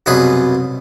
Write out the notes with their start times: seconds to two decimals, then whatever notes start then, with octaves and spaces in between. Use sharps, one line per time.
0.06 C2 F#2 B2 G#4 B4